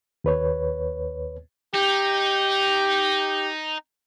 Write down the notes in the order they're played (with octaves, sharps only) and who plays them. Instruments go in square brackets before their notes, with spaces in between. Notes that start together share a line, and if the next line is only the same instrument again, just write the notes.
[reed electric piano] D#2 B4 C#5
[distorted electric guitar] D#4 [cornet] G4